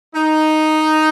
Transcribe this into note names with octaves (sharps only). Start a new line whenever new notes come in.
D#4